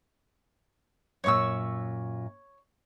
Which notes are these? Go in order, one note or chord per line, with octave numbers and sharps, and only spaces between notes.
F#2 A#2 C#5 C#6 E6